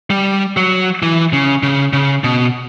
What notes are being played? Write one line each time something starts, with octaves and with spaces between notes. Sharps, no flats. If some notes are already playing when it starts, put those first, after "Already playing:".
G3
F#3
E3
C#3
C#3
C#3
B2